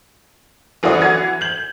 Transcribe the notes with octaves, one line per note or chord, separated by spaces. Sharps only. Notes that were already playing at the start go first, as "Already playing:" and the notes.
G1 E3 F3 F#4 D5 D#6
E3 F#3 F#5 G#6 D#7
G6 F#7